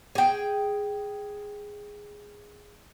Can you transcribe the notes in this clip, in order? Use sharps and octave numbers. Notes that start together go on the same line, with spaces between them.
G#4 G5